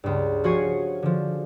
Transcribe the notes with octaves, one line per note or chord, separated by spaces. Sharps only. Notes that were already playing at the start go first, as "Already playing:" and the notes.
C#2 G2
F3 F#4 C#5 G#5 C#6 C7
D3 F3